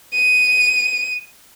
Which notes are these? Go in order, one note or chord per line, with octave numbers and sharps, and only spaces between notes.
D#7